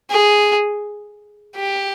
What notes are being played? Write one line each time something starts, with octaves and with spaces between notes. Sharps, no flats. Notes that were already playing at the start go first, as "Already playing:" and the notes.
G#4
G4